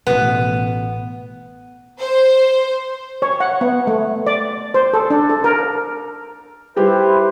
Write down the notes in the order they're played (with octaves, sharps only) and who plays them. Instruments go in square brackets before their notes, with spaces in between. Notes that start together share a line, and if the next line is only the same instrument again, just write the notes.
[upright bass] A1 B2 [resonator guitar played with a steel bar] B3
[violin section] C5
[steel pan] C#5
F#5
B3
A3
D5
C5
A4
D4
A4
A#4
[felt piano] G3 G4 [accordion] E4 B4 C5